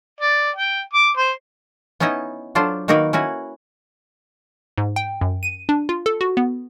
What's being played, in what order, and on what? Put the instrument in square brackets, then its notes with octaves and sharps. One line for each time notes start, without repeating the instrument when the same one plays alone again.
[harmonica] D5
G5
D6
C5
[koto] B3 C#4 D#4 E4 D#5
F#3 D4 F4 A4 C5
D#3 A#3 D#4 F#4 A#4 B4
C#4 E4 F#4 G#5
[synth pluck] G#2
G5
F#2
D#7
D4
F4
A4
F#4
B3